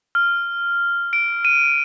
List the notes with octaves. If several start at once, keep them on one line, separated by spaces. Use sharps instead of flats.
F6
D7
D#7